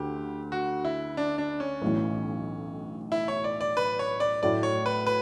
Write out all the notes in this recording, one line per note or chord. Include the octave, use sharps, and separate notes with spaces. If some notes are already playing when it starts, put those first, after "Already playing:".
Already playing: D2 D3 G4
F#4
E4
D4
D4
C#4
B1 A2 E3
E4
C#5
D5
D5
B4
C#5
D5
A2 F#3 A3 E4 D5
C#5
B4
B4